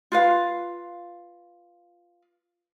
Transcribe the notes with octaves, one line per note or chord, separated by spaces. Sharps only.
F4 B4 F5